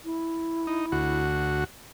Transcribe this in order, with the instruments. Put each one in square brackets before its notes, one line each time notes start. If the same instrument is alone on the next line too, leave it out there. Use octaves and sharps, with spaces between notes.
[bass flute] E4
[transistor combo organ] D#4
D2 F#4